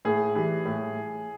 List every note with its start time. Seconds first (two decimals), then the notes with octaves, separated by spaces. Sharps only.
0.05 A2 G#4
0.35 E3 G3
0.65 A2